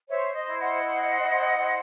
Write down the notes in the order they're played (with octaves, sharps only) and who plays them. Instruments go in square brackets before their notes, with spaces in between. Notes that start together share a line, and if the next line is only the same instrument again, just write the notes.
[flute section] C5 C#5 E5
D#5
E4
D#5 F#5
C5
E4
C5